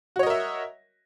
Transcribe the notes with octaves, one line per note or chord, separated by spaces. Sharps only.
F#4 A#4 C#5 D#5 E5